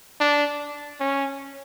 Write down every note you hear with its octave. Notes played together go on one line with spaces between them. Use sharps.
D4
C#4